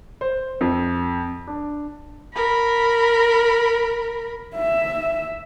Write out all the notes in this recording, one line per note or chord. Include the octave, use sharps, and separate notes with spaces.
C5
F2
D4
A#4 B5
E5